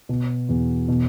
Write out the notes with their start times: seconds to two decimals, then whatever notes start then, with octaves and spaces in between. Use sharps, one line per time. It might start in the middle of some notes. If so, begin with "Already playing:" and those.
0.09 B2
0.49 E2
0.88 B2